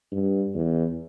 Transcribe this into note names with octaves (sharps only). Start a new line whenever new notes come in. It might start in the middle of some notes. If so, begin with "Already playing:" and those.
G2
E2